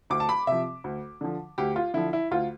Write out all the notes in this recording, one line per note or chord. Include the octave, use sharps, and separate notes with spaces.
D2 D6
A5
B5
C3 F3 E5
D2
D3 F3
D2 G4
F4
D3 F3 E4
E4
D2 F4